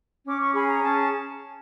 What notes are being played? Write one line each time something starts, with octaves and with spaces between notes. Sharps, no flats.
C#4 D6
C#6
G#4 B5
A#5
C#4 A5